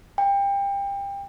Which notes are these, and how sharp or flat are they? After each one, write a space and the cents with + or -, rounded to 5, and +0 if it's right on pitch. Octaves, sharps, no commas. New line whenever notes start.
G5 +25